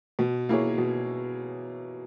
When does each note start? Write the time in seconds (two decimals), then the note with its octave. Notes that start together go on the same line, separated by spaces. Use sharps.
0.19 B2
0.49 A#3 E4 G#4 C#5
0.78 B2